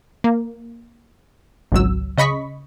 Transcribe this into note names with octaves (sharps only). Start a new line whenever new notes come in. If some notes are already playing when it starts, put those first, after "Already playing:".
A#3
G#1 C#2 F#3 E6
C#3 D#5 B5 C#6 B6